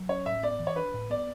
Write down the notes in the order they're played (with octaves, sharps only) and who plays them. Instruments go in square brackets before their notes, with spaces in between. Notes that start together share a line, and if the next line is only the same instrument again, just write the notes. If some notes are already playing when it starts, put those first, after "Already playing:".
Already playing: [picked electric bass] F#3
[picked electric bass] C#4 [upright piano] C#5
[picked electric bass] A2 [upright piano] E5
[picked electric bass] B3 [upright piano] D5
[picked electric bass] E3
[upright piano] C#5
[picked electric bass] D4 [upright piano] B4
[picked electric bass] A2
[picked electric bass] B3 [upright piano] D5